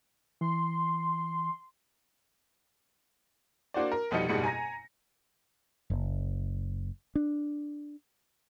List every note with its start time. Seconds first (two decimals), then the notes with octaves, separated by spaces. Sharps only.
0.41 E3 C6
3.74 A#3 D4 F#4 C5 D5
3.92 A#4
4.11 F1 B2 F3 G3 D#4 C#7
4.29 F#1 G#2 B2 G3 C#7
4.44 G#5 A#5 A#6
5.90 F#1
7.15 D4